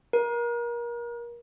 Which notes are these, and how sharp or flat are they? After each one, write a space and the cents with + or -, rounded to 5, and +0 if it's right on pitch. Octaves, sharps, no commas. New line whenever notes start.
A#4 +30